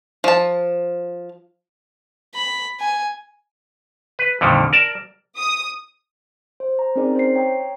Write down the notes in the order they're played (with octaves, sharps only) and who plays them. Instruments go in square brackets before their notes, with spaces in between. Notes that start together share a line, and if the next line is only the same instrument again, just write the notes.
[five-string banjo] F3 A5
[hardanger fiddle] B5
G#5
[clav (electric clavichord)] B4
F2 A#2 D3 D#3 G3
A#4 D5 A5
[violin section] D#6
[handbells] C5
A#5
C4 C#4 D#4 G#4 A#4 D5
C5 C7
C#5 G5 A#5 D#6